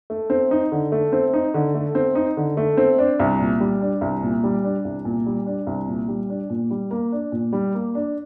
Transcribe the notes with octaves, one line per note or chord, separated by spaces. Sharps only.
A3
C4
D#4
D3
A3
C4
D#4
D3
A3
C4
D#4
D3
A3
C4
D4
C2
A#2
G3
D4
C2
A#2
G3
D4
C2
A#2
G3
D4
C2
A#2
G3
D4
A#2
G3
A#3
D4
A#2
G3
A#3
D4